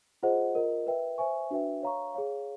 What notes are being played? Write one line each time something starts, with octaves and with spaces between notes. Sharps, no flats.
F4 G#4 C5 D#5 F#5
F4 A#4 D#5
B4 E5 G5
C5 E5 G#5 C#6
D4 F#4 B4 E5 G5
C#5 F5 A#5 C#6
G#4 C#5 F5